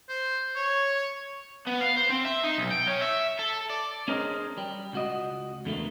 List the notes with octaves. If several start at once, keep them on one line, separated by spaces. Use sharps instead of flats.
C5
C#5
B3
F5
C5
C4
E5
D#4
B1
G5
C#4
E5
A4
D5
C#4 D4 G#4 A#4 C5 D#5
G3
C#2 F#4 D#5
E2 D3 A3 A#3